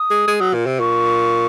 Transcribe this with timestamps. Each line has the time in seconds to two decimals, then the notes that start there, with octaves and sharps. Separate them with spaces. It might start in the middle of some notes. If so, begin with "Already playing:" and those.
Already playing: D#6
0.11 G#3
0.28 G#3
0.41 F#3
0.54 A#2
0.66 C3
0.80 A#2 C#6